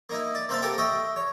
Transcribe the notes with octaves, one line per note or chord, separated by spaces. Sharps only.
A#3 D#4 E4
D5
A#3 C4 C5 E5 F5 A5
G4 A4 A#4 F#5 G5
D#5 E5 G5 C#6
C#5